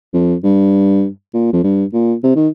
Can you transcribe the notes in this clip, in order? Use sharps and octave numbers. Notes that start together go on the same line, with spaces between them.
F2
G2
A#2
F2
G2
A#2
C3
D#3